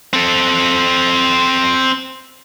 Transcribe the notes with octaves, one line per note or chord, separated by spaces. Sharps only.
C4 A4